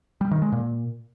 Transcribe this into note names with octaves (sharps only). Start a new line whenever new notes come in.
G3
D#3
G#3
A#2